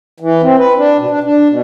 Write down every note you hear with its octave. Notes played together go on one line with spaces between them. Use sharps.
E3
C4
B4
D4
B2
D4
D4
B2